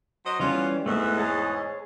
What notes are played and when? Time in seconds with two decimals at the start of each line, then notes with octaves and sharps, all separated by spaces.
0.26 F#3 C5 D#5
0.40 E3 G3 B3 C#4 F4
0.86 E2 G#2 A3 B3 E5
1.17 G#4 C#5 A5